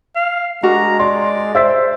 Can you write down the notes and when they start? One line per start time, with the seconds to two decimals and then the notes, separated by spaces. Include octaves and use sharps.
0.16 F5
0.63 G#3 D4 F#4 A#4 A#5
0.99 D5 C6
1.55 C5 E5 E6 B6